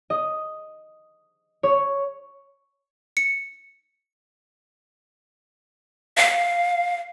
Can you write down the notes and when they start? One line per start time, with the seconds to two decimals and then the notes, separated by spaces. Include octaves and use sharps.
0.10 D#5
1.63 C#5
3.17 C#7
6.17 F5